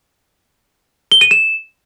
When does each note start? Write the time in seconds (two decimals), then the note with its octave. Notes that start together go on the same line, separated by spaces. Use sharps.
1.12 G7
1.21 D#7
1.31 E7